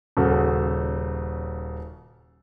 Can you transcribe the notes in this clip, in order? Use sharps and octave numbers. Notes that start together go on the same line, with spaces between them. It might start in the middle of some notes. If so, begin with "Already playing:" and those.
D#1 C#3 F#4 A4